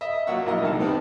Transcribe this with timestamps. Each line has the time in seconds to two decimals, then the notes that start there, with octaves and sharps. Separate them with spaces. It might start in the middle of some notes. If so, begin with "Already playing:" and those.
0.01 D#5 E5
0.27 F#3 A#3 F4 F#5 C#6 E6
0.46 A#1 E4 A#4 D#5
0.62 C2 D#3 A4 A5
0.79 G3 B3 C4 D#4